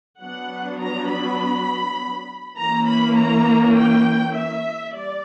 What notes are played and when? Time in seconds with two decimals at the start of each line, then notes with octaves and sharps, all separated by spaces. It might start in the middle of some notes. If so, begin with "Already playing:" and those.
0.22 F#3 B3 D4 F#5
0.81 A#5
1.11 B5
2.58 E3 A#3 C#4 A#5
2.88 B5
3.17 A#5
3.76 G5
4.35 E5
4.94 G3 D5